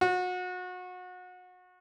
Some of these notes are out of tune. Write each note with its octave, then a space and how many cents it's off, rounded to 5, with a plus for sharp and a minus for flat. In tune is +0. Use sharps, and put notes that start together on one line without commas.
F#4 -30